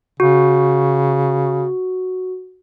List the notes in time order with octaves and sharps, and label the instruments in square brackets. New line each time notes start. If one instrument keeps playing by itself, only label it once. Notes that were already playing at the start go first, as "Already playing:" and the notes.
[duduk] C#3 [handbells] F#4